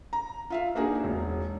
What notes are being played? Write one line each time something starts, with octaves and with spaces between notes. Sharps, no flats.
A#5
F4 E5 F5
A#3 D4 D#4 F#4 G#4 A#4
E1